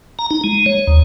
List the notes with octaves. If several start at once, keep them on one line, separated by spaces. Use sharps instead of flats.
A#5
D#4
G#3
C#5
D#2